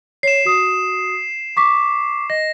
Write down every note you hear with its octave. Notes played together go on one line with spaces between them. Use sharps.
C#5 C7 E7
F#4 D#6
C#6 D6 B6
D#5 A#6